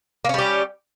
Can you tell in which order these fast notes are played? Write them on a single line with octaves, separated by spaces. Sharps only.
A#3 C#4 G3 G4